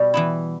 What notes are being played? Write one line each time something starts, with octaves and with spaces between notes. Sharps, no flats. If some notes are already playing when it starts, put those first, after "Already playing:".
Already playing: B2 G3
E3 B3 E4